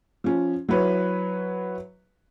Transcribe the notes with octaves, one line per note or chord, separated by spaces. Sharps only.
F3 C#4
F#3 E4 B4 C#5